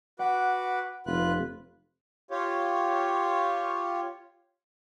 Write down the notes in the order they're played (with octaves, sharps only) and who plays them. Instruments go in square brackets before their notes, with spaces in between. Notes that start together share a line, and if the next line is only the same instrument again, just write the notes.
[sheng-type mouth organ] F#4 B4 D6 [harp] F#5
[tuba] F1 [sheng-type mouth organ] F4 B4 F#6
[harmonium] F4 G4 C#5